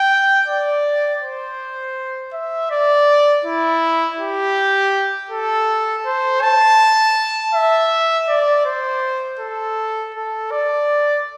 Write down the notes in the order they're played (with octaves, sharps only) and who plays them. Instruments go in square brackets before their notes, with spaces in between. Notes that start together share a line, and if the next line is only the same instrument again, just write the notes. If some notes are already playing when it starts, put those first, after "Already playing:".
Already playing: [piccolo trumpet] G5
D5
C5
E5
D5
E4
G4
A4
C5
A5
E5
D5
C5
A4
A4
D5